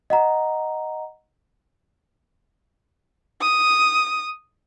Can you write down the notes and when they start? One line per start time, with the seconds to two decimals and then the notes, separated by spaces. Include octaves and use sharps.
0.10 D#5 F#5 A#5
3.41 D#6